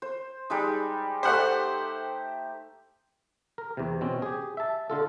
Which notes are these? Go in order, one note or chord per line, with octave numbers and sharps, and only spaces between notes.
C5
G3 G#3 D#4
A3 G4 C5 F#5
A#4
E2 C3
B2 C4 C#4
G4 G#4
E5 A5
D3 F4 A4